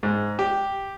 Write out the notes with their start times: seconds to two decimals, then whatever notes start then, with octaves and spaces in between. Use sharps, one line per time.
0.03 G#2
0.39 G4